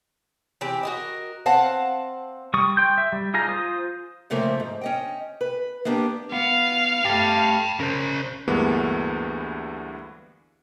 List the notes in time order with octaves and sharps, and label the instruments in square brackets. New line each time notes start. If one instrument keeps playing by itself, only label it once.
[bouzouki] E3 C4 G4
F#4 A#4 D#5
C4 F5 F#5 A5
[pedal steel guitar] G3 C#6 D#6
G5 C6 G6
E5
G3
D#4 F4 G#4 A#5
F4 C5 D#6
[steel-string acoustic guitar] A#2 C#3 F3 A3 A#3 C4
G#2
C#4 D#5 G5
B4
A#3 B3 D4 G4
[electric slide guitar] B3 [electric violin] F5
[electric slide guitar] A3 G4 [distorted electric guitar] G5 A5
[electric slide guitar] C#3 [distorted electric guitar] A#4 C5
[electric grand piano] D2 G2 E3 G#3 A#3 B3